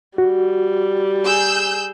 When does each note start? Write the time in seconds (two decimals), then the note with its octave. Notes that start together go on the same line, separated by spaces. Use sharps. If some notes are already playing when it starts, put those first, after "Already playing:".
0.18 G3 F#4
1.23 G#4 E6 G6